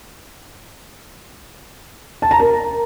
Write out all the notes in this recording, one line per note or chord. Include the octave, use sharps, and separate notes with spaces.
A5
A#5
A#4